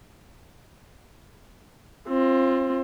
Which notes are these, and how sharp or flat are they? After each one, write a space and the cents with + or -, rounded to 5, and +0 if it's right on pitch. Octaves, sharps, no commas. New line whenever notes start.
C4 +25 F4 -15